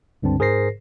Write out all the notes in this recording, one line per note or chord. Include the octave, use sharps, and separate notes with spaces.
C#2 G2 D3 C4 A5
G#2 G#4 A#4 C5 A#6 C7